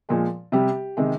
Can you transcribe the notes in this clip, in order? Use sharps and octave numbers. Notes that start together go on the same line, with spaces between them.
A#2 F3 G#3
C3 G3 G4
C3 D#3 G#3